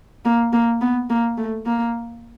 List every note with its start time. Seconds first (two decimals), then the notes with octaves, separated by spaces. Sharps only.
0.25 A#3
0.53 A#3
0.81 B3
1.10 A#3
1.38 A3
1.66 A#3